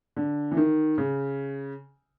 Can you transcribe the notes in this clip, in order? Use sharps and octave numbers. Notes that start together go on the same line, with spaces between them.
D3
E3
D#3
C#3